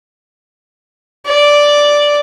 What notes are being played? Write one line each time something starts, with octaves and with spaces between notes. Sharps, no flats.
D5